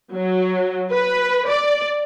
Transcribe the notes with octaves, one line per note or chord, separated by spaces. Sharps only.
F#3
B4
D5